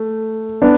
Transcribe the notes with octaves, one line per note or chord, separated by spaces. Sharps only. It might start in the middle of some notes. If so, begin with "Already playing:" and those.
Already playing: A3
B3 D4